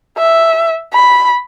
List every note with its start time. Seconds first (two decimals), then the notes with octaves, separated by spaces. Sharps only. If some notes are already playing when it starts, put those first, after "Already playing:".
0.17 E5
0.93 B5